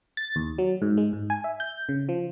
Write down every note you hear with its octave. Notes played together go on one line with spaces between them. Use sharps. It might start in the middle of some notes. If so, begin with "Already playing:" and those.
A6
D#2
F#3
G#2
G#3
G#2
G#5
E5
G6
C#3
F3